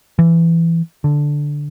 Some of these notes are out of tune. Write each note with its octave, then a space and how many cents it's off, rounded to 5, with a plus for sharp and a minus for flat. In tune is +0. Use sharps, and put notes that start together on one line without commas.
E3 +15
D3 +0